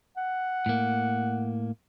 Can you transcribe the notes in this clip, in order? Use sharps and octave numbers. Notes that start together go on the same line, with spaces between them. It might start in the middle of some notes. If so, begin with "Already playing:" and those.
F#5
A2 A#3